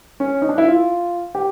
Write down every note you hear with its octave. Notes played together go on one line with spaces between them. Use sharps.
C#4
D#4
D4
E4
F4
G4